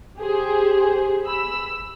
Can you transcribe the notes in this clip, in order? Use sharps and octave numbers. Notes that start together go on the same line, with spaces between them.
G4 G#4 C5
B5 E6